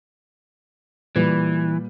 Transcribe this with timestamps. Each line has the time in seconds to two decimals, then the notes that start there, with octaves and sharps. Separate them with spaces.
1.16 A#2 E3 G3 B4